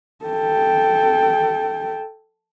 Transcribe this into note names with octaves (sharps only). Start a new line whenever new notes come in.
A4 G5